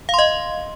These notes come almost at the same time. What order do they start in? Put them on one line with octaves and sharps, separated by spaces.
F5 C6 D#5